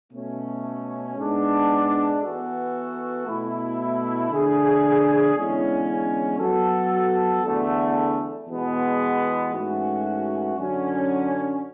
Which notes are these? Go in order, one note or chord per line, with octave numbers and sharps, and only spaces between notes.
B2 A3 C#4
G#2 G#3 B3 D4
E3 B3 F#4 A4
B2 A3 E4
D3 A3 D4 G#4
E2 D3 G#3 C#4 E4
F#3 B3 F#4 A4
E2 D3 A3
E2 B2 G#3 B3
G#2 E3 A3 C#4 F#4
F#2 D3 F#3 C#4